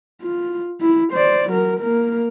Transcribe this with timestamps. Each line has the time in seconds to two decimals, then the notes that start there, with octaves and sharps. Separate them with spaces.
0.22 F4
0.81 E4
1.13 C5 D5
1.50 F#3 A#4
1.80 A#3 A#4